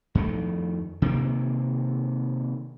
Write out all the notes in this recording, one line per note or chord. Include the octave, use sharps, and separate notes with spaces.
F2 D#3 A3
C3 D#3 A#3